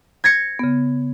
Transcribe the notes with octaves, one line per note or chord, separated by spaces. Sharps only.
G#6 A#6 C#7
C#3 B3